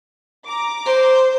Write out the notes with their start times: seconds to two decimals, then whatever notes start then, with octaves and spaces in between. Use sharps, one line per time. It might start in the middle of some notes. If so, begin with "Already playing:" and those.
0.46 A#5 D6
0.85 C5